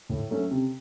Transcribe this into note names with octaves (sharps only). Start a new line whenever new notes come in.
A2
F#3 A3 C#4
C3